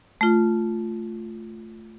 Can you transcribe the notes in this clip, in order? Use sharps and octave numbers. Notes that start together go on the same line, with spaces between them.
A3 F4